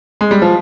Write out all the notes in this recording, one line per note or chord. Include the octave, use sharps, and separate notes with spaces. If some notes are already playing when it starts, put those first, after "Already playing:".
G#3
G3
F3